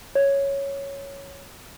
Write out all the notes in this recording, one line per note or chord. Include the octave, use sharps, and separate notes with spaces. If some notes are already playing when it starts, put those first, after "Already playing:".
C#5